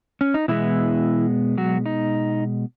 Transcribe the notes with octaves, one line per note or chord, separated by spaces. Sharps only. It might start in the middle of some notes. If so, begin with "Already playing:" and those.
C#4
D#4
B2 E3 G#3 B3 E4
F#3 F#4
D#4